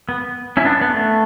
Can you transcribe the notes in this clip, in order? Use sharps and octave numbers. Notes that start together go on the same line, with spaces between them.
B3
C#4 E4
B3 D4
B3
A3